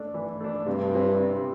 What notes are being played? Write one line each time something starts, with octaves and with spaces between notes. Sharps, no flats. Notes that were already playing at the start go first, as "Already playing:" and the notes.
Already playing: A3 D4
E3
A3 D4
G2 C3
G3 C4 E4
C3